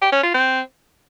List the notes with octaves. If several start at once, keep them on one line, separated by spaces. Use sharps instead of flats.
G4
C#4
F4
C4